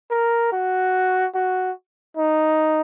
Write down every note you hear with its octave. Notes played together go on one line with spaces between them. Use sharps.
A#4
F#4
F#4
D#4